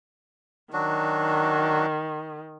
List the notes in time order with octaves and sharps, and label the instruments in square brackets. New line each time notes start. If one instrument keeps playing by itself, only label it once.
[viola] D#3 [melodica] F#3 D4 F#4